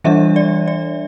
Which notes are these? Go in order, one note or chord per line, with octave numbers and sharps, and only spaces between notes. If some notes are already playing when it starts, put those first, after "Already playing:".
E3 G3 D4 E5
D5
D5